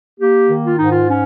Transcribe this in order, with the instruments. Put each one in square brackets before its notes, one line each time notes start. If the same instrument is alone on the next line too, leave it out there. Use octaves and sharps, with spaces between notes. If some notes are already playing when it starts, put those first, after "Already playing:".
[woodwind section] A#3 G4
D#3
F4
G#2 D#4
F4
C#4